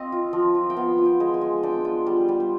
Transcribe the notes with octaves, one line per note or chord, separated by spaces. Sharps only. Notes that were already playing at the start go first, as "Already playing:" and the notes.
Already playing: C4 D#5 F5
F4
F3
F3
G5
B3 F5
F4
G5
G#3
G#5
G#3
D4 G5
F4
G3
G3
C5